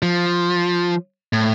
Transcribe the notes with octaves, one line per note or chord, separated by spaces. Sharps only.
F3
A2